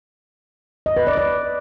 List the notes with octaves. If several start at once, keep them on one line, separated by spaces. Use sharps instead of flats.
D#5
B4
D5
D5